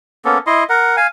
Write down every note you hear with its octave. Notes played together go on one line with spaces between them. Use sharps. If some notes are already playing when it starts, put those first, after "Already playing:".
A#3 B3 C#4 A4
E4 D#5 C6
A#4 F#5
F5 G#5